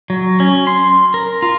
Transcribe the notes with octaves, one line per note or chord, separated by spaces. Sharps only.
F#3
C#4
C6
A#4
F4